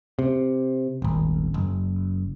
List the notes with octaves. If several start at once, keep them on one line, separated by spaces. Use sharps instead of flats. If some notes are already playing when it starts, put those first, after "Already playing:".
C3
D#1 G#1
F#1